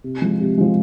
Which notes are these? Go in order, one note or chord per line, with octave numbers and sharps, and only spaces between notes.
C3
F3 G#3
C3
F3 G#3